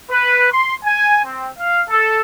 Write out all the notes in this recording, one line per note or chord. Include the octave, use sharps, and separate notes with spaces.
B4
C6
G#5
C4
F5
A4